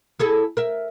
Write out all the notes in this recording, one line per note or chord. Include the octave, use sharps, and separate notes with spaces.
E4 G#4 A4
A#4 E5